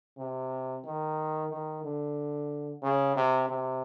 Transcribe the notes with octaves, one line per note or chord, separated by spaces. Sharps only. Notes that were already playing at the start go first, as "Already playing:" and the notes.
C3
D#3
D#3
D3
C#3
C3
C3